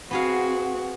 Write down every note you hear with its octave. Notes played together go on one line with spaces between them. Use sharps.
B3 C4 F#4 G#4 F5